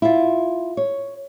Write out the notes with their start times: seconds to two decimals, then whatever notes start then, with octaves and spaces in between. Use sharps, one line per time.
0.02 E4 F4
0.77 C#5